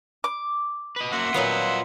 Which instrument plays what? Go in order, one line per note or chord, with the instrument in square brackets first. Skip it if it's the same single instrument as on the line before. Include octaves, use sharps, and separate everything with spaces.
[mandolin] D6
[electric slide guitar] B4 D#5
[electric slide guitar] A#3 C#4 F#4 [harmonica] E5 F#5 C6
[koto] A#2 F#3 B3 [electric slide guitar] F4 D#5